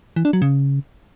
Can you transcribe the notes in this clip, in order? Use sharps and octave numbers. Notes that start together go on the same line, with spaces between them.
E3
D4
F#3
C#3